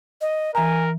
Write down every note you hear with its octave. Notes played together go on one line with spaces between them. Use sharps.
D#5
E3 A#4 G#5 A#5